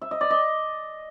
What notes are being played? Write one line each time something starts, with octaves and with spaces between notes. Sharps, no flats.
E5
D#5
D5
D#5